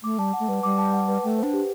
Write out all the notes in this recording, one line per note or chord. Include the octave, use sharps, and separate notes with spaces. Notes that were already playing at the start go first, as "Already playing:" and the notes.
A3 D6
G3 A5
F#5
A3
G3 B4
G3 D6
A5
F#5
B4
A3 G5
C5
D4
G4